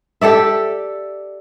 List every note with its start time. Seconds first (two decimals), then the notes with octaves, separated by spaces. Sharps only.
0.21 G4 A4 D5 E5